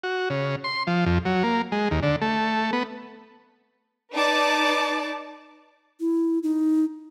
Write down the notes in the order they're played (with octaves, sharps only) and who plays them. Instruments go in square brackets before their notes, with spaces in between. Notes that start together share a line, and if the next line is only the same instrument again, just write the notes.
[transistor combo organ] F#4
C#3
C6
F3
F2
F#3
A#3
G#3
D#2
D3
A3
B3
[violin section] D#4 B4 D5 A5 D6
[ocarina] E4
D#4